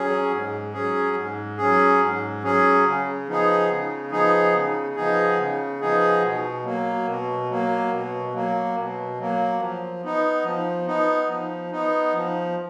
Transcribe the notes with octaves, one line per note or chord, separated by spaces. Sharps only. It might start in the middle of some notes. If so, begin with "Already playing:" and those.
Already playing: F#3 C#4 G#4
G#2
F#3 C#4 G#4
G#2
F#3 C#4 G#4
G#2
F#3 C#4 G#4
C#3
F3 B3 D#4 G#4
C#3
F3 B3 D#4 G#4
C#3
F3 B3 D#4 G#4
C#3
F3 B3 D#4 G#4
B2
F#3 A#3
B2
F#3 A#3
B2
F#3 A#3
B2
F#3 A#3
F3
B3 D#4
F3
B3 D#4
F3
B3 D#4
F3